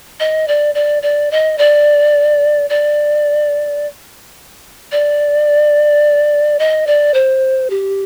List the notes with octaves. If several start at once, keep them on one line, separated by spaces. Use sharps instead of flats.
D#5
D5
D5
D5
D#5
D5
D5
D5
D#5
D5
C5
G4